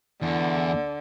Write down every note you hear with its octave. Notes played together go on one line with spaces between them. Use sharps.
E2 D3